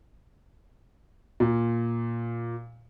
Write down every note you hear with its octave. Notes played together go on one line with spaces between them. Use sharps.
A#2